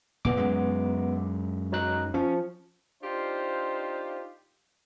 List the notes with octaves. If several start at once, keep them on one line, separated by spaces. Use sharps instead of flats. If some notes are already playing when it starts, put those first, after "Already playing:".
A#2 B3 D6
F#2 G#3
F#3 D#4 F#6
F3 C#4
D4 D#4 F4 G4 C5 F5